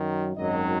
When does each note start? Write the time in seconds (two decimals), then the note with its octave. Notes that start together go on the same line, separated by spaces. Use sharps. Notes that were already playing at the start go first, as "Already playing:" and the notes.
Already playing: F#2 D#3 F#3
0.36 G#1 F#2 D#3 F#3 D#5